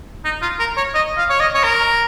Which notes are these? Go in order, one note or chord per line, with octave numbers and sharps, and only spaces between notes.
D#4
F4
A#4
C#5
D#5
F5
C#5
D#5
C#5
A#4